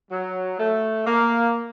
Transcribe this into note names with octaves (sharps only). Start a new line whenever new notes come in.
F#3
A3
A#3